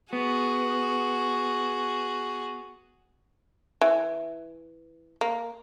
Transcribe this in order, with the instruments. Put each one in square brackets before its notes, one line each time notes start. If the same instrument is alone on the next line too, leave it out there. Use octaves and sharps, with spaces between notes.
[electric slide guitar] B3 [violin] F#4 G#4
[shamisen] E3
A#3